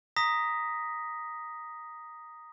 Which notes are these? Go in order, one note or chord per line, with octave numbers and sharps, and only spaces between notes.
A#5 D#6 A#6 B6